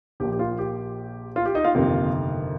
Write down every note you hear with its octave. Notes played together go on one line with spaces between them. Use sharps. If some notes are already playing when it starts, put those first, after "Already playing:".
A#1 A#2 F3 G4
G4
F4
G4
F4
G4
D#4 D#5
F4 F5
G1 F2 C3 D#3 A#3